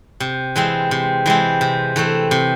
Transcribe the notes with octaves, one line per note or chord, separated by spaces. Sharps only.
C3
E3 G#3 C4
C3
E3 G#3 C4
C3
E3 A3 C4
C3